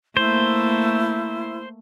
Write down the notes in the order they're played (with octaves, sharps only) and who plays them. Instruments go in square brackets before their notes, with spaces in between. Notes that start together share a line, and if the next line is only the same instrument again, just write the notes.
[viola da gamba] A3 A#3 [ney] E4 [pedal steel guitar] C5